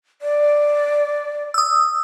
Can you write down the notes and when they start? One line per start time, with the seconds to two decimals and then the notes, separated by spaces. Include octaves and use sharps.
0.22 D5
1.54 D#6 E6